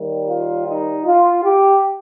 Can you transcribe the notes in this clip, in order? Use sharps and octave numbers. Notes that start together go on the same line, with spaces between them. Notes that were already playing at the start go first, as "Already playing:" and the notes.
Already playing: D#2 D#3 G3
F4
D#4
F4
G4